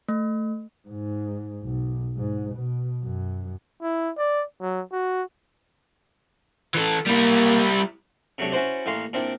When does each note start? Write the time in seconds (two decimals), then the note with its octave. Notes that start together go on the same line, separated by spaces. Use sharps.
0.08 A3
0.88 G#2
1.63 B1
2.17 G#2
2.55 B2
3.03 F#2
3.82 E4
4.18 D5
4.61 F#3
4.92 F#4
6.75 E3 A4
7.07 G3 A#3 E4
8.38 C3 F#3 A3 D4
8.52 C#4 E4 F#4 B4 C5 D5
8.86 A1 E3 A#3 F5 C6 C#6
9.13 A#2 C4 D4 E4